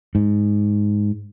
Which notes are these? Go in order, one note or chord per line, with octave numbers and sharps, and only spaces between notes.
G#2